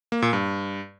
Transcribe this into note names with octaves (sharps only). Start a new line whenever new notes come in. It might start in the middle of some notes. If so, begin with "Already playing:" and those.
A#3
A#2
G2